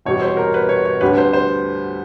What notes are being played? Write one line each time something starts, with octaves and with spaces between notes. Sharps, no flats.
E2 B2 G3 C#5
C5
A#4
B4
C#5
C#5
D2 D3 G3 B4
C5
C5